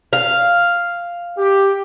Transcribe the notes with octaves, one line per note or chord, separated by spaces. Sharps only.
F5
G4